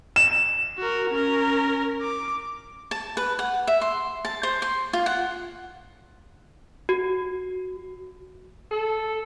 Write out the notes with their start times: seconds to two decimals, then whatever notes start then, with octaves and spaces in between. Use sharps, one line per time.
0.16 E7
0.78 F#4 A#4
1.11 C#4 A#4
2.02 D6
2.91 A5
3.17 B4
3.39 F#5
3.67 E5
3.81 C6
4.25 A5
4.43 C5
4.62 C6
4.93 F4
5.06 F#5
6.89 F#4
8.70 A4